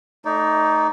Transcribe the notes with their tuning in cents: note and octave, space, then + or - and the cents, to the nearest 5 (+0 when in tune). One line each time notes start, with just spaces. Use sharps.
A3 +0 D#4 +0 D5 -30